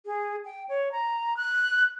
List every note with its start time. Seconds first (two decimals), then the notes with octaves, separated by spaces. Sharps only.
0.06 G#4
0.45 G5
0.69 C#5
0.92 A#5
1.37 F#6